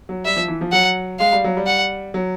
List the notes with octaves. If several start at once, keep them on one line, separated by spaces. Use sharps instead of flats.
F#3
G3 E5
F3
E3
F3
F#3 F#5
G#3 F5
G3
F#3
G3
F#5
F#3